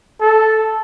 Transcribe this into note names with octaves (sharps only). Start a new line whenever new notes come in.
A4